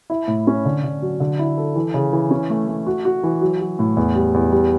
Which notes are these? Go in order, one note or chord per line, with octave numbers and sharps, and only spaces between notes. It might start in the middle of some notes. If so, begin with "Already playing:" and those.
E4
A2
C#4
D3
D3
F#3
D3
E4
A4
E3
C#3
E3
C#4
A3
A3
F#4
F#4
E3
F#3
F#3
A2
E2
G3
E2
G3